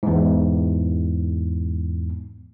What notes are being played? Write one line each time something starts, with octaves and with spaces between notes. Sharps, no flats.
E2 G#2